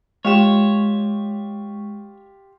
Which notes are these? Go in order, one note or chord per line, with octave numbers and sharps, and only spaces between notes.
G#3 F4 G4 C#5 E7